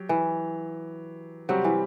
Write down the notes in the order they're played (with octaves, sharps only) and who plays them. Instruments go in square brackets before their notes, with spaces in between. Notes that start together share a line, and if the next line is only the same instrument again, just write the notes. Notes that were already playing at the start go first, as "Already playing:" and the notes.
Already playing: [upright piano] F#3 G4
[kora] E3
[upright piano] C3 G3 C4 G4 [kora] F#3
[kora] E3